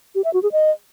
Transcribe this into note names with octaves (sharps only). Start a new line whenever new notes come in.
G4
E5
F#4
G#4
D#5